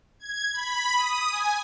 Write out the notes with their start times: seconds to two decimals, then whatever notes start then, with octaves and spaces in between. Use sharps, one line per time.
0.19 G#6
0.53 B5
0.95 D#6
1.30 G#5